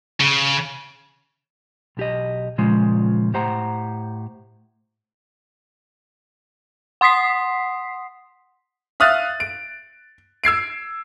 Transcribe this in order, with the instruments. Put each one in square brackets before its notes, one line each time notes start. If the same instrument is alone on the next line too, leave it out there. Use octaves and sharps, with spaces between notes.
[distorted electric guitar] C#3
[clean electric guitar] B1 G4 D#5
A#2 C#3 F3 G#3
A2 G4 C5 F#5 A#5
[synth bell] F#5 C6 D#6 B6 C7
[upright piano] E5 F5 D#6 F6 F#6 A6
D7
E6 G#6 C7 D7